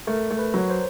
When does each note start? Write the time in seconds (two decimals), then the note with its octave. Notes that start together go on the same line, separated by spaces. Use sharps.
0.07 A3 A#4
0.31 A3
0.39 B4
0.54 F#3 C#5
0.70 C5